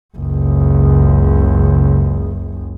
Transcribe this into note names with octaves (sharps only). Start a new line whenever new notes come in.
F#1 C#2